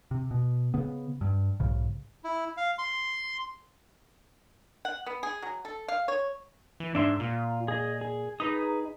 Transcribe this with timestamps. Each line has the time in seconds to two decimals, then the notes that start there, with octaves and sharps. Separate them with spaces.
0.11 C3
0.31 B2
0.74 C#3 B3
1.21 G2
1.60 B1 G#2 C#3
2.24 E4
2.57 F5
2.78 C6
4.85 F#5
5.06 B3
5.23 G#4
5.42 F#3
5.65 A4
5.88 F5
6.08 C#5
6.80 E3
6.95 G#2 D4 E5 C6
7.20 A#2 F4
7.68 G#4 D#5
8.01 G#4
8.40 D#4 G#4 B4 D#6